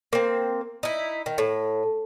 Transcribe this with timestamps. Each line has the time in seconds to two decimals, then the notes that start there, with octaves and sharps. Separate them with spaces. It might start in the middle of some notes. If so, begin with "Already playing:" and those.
0.13 A#3 C4
0.83 D#4 E4
1.26 D#3
1.38 A2